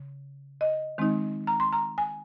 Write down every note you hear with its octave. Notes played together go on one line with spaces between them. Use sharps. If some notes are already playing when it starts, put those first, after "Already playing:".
Already playing: C#3
D#5
D#3 G#3 C4 D#4
A#5
C6
A#5
G#5